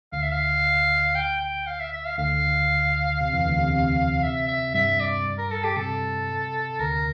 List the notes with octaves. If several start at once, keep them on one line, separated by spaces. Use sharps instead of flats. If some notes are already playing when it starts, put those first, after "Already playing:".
D2 D3 F5
E5
F5
G5
G5
F5
E5
E5
F5
D2 D3 F5
C3
E2 E3
D2 D3
C3
C3
E5
E5
G2 G3 E5
D5
A#4
A4
G4
C3 A4
D2 D3 A#4